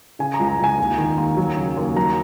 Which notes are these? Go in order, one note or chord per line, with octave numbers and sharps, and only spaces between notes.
C#3 G#5
A#5
C#2
A#5
C#2
G#5
D#2
D#3
D#2
F#3
C#3
D#2
F#3 A#5